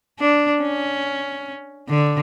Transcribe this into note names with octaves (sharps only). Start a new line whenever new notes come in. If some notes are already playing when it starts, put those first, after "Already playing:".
D4
C#4
D3